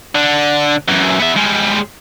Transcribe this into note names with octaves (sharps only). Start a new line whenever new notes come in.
D3
F#2 E3
B3 E5
G3 G#3